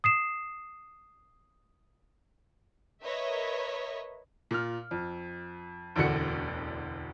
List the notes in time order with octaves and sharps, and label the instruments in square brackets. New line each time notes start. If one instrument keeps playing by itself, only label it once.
[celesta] D#6 C7 E7
[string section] A#4 B4 C#5 D#5 E5
[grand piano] A#2 F6
F2
E1 A1 D2 D3 F#4 C#7